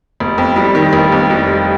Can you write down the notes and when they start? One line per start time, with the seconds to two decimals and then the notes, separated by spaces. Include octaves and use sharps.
0.20 F1
0.38 F2
0.56 G3
0.75 D#3
0.93 F1
1.12 F2
1.30 G3